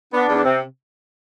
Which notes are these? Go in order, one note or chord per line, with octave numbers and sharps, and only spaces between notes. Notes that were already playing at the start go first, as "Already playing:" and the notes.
B3 D4
E2
D4
C3 C4